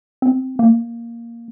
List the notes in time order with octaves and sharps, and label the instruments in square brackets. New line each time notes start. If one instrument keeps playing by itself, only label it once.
[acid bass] C4
A#3